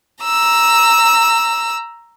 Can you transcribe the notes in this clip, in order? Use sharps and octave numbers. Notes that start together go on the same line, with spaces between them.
A#5 E6